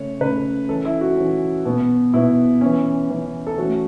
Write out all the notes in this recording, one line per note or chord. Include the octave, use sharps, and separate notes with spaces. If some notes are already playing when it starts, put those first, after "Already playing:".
Already playing: C#3 A3 C#4 C#5
C#3 A3 C#4 B4
E3 C#4 A4
E4
F#4
E3 C#4
B2 B3
B2 B3 E4
E3 C#4
E3 C#4
A4
E3 A3 C#4 F#4